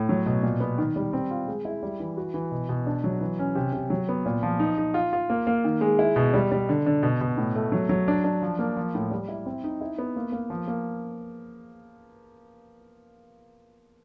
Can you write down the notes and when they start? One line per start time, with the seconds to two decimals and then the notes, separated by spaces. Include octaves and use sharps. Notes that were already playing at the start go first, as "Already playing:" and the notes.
Already playing: A2
0.09 F#3
0.26 B2
0.43 A#2
0.60 B3
0.78 D#3
0.96 G3
1.13 C4
1.31 F4
1.48 G#3
1.65 E4
1.83 G3
2.00 E3
2.17 F#4
2.34 E3
2.51 B2
2.69 B2
2.86 D4
3.04 F#3
3.21 E3
3.39 C#4
3.55 C3
3.73 C3
3.90 F#3
4.09 B3
4.26 A#2
4.43 F3
4.60 D#4
4.78 D#4
4.94 F4
5.13 F4
5.30 A#3
5.47 A#3
5.64 D#3
5.81 G#3
5.99 E4
6.16 B2
6.34 G3
6.52 G3
6.69 D3
6.86 D3
7.03 B2
7.21 B2
7.37 A2
7.56 A3
7.72 F#3
7.89 F#3
8.08 D4
8.24 D4
8.42 F3
8.59 A#3
8.77 F3
8.95 A2
9.11 G3
9.28 E4
9.46 C4
9.64 D#4
9.81 E4
9.98 B3
10.16 A#3
10.32 A#3
10.50 F3
10.68 A#3